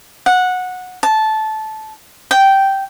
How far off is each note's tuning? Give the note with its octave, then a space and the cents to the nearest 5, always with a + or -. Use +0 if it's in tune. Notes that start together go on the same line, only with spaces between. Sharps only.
F#5 -15
A5 -15
G5 -10